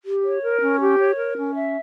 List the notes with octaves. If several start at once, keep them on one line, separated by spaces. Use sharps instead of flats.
G4
C#5
A#4
C#4
G4
C#5
A#4
C#4
E5